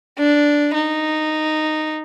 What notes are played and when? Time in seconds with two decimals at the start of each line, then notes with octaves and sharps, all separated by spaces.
0.18 D4
0.74 D#4